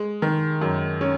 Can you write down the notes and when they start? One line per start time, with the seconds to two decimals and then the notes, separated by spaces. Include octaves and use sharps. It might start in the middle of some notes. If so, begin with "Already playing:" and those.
Already playing: G#3
0.22 D#3
0.62 F#2
1.01 C#4